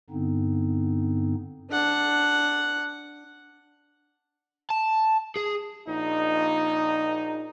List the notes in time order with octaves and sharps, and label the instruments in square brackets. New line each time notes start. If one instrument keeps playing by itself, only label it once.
[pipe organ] G2 D3 B3 C4 D#4
[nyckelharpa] D4 F#5
[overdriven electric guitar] A5
G#4
[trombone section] A#1 D#4